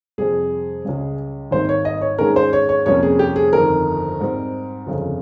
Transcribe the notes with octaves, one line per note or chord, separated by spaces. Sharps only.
F2 C3 G3 G#4
C#2 C#3 G3
G#1 G#2 D#3 G3 C5
C#5
D#5
C#5
G#2 D#3 G#3 C#4 A#4
C5
C#5
C#5
F2 C3 G3 A#3 C#4 C#5
G#4
G4
G#4
G1 F2 D#3 A#4
G#2 G3 C4
G1 F2 C#3